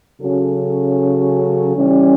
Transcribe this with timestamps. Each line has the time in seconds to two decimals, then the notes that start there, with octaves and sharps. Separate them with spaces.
0.21 C#3 F#3 C#4 F#4 A4
1.76 E3 G3 C#4